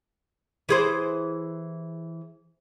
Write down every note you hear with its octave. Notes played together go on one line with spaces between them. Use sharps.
E3 G#4 C5